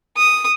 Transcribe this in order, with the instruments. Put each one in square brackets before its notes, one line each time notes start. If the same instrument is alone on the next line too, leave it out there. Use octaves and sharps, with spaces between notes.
[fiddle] D#6